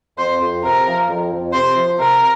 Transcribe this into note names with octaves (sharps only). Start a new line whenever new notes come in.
F2 C5
F2
C3 A#4
F3
F2
F2
C3 C5
F3
C3 A#4